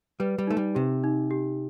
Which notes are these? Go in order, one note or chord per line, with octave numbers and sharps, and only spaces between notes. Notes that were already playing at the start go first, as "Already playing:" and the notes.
G3 B4
G3
A3 D#4
G3
C3 G4
D#4
G4